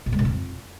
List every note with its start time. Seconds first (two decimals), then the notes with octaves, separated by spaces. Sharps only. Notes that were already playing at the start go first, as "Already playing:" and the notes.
0.06 A#2
0.13 G#3
0.19 B2
0.25 F2